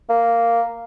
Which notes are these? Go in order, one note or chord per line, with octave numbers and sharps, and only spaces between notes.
A#3